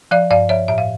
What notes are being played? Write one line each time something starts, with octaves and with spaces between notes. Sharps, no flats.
F3 D5 F5
G2 D5 F5
F3 C#5 E5
A2 E5
F5